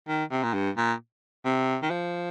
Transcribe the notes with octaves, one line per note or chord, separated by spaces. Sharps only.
D#3
C3
A#2
G2
A#2
C3
D#3
F3